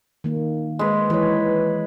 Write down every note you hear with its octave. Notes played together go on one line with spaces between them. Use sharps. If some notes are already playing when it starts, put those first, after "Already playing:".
D#3 A#3
G#3 B4
E3 B4 C#5